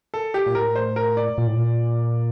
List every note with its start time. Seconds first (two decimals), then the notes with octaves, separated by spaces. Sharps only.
0.14 A4
0.34 G4
0.46 A#2
0.55 A2 A#4
0.75 C5
0.96 A#4
1.17 D5
1.38 A#2
1.47 A2
1.56 A#2